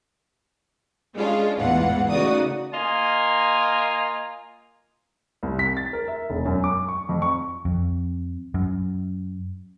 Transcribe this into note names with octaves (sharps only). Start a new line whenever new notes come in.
G#3 C#4 D4 F4
A1 E2 G#2 E3 F4 F#5
C#3 A3 D#4 F#4 D5 D#6
A#3 F4 D#5 G#5
C2
B6
A6
A#4
E5
E1
F#2
D6
C#6
F2
C#6
F2
F#2